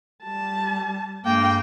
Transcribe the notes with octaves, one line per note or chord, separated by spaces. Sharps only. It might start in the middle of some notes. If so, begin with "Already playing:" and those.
G3 A5
G2 G#3 A#3 G5